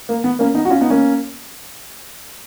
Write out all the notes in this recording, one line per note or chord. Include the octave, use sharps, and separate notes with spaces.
A#3
B3
A#3 C#4
B3 D#4
F#4
C#4 F4
B3 D#4
A#3 C#4